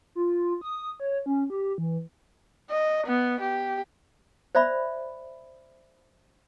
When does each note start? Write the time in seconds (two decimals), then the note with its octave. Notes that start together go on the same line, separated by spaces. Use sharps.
0.15 F4
0.61 D#6
1.00 C#5
1.26 C#4
1.50 G4
1.78 E3
2.70 D#5
3.06 B3
3.41 G4
4.55 C5 D5 E5 B5